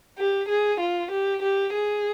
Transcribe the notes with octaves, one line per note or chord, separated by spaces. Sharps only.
G4
G#4
F4
G4
G4
G#4